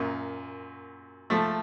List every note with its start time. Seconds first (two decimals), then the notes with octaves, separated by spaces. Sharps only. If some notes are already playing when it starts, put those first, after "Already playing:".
Already playing: F#2 A#2
1.30 F3 A3